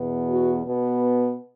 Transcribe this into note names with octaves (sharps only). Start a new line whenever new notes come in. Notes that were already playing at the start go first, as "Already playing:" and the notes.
Already playing: E2 B2 B3
F#4
B2 B3